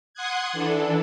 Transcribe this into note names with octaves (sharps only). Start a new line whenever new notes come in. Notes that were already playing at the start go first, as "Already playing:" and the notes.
F#5 C6 D#6 F#6 G#6
E3 D4 A4